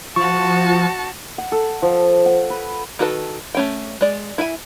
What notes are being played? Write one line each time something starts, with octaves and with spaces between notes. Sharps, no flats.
F3 F#4 A5 C#6
F#5
A4
F3
F#5
B4
D#3 F#4 A4 B4 A5
A3 C#4 G5
G#3 D5
E4 E5 G#5